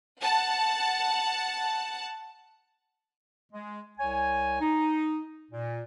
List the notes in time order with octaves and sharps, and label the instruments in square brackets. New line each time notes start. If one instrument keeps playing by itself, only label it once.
[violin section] F#5 A5
[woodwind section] G#3
C2 C#5 G#5
D#4
A#2